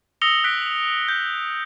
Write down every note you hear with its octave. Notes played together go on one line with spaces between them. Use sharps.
D#6 E6 A#6 C#7 F7 G7
F#6 B6 D7
G6